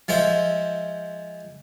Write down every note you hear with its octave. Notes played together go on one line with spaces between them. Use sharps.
F3 G#3 C5 E5